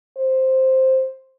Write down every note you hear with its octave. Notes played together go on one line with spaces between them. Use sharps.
C5